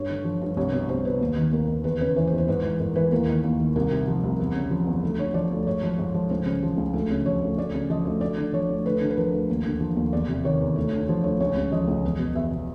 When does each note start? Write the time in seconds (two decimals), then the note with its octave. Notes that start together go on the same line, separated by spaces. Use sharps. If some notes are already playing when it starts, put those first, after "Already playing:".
Already playing: G2 C#5
0.10 D3
0.25 F3
0.41 G2
0.57 C2 C#5
0.72 B2
0.89 C2 C5
1.04 B2 B4
1.21 D#2
1.36 D#3
1.52 D#2 A#4
1.68 D#3
1.84 E2 B4
2.01 C#3 B4
2.16 E3 C5
2.27 C5
2.32 E2
2.38 C5
2.48 G#2 B4
2.64 E3
2.79 G#2 A#4
2.96 E3 B4
3.12 D#2 A#4
3.28 D#3
3.44 D#2
3.60 D#3
3.76 C2 A#4
3.91 C3
4.08 F3
4.24 C2
4.40 E2
4.55 C#3
4.71 F3
4.86 E2
5.03 D2
5.18 D3 C#5
5.34 F3 D5
5.51 D2
5.66 G#2 C#5
5.83 F3
5.98 G#2
6.14 F3
6.30 C#2 C5
6.46 C#3
6.63 F3
6.78 C#2
6.94 D2
7.10 C#3
7.26 F3 C#5
7.42 D2
7.58 D2 D5
7.74 C#3
7.90 F3 D#5
8.05 D2
8.21 D2 D5
8.38 D3
8.53 F3 C#5
8.69 D2
8.86 D2 B4
9.02 D3
9.10 B4
9.17 F3 A#4
9.33 D2
9.50 D#2
9.65 D3
9.81 F3
9.96 D#2
10.13 E2 D5
10.28 C3
10.44 D#3 C#5
10.61 E2
10.76 D2
10.93 D3
11.08 F3 C5
11.24 D2 C#5
11.40 C#2 C#5
11.57 C#3
11.72 F3 D#5
11.88 C#2
12.04 E2
12.19 B2
12.35 E2 E5
12.51 B2